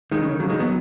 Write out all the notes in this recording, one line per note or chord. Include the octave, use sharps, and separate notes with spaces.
D#3 G#3
C#3
D#3
C#3 F#3
D#3 G#3
F#3 B3